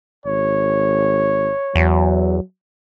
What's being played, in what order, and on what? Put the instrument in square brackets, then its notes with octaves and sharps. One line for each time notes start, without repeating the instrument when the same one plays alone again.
[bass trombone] G#1 [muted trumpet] C#5
[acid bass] E2 [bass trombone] F#3